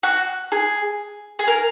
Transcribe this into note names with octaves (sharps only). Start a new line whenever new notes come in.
F#4
G#4
G#4
A#4